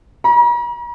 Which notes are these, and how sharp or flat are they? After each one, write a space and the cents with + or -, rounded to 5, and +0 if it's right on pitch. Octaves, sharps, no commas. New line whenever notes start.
A#5 +45